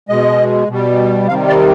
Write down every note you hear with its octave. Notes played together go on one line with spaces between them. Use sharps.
B2 G#3 D#5
B2 G3
C3 D#3 G3 F5
D5